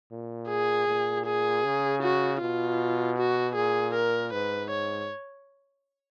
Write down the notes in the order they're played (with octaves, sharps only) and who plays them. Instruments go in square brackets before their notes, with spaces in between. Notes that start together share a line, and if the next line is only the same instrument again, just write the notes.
[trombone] A#2
[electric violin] G#4
[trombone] A#2
[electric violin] G#4
[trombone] C#3
[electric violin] F#4
[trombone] B2 [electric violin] F4
[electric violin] F#4
[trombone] A#2 [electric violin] G#4
[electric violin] A#4
[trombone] G#2 [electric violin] B4
[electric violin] C#5